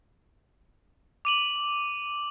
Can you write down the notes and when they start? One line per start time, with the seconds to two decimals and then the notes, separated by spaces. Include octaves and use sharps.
1.25 D6 D#7 F#7